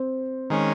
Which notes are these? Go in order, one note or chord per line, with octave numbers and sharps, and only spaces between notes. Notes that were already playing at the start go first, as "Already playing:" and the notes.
Already playing: C4
D#3 G#3 C#4